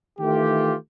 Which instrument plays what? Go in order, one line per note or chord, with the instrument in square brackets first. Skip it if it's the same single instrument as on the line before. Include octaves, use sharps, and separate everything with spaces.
[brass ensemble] D#3 E3 A3 F4 G4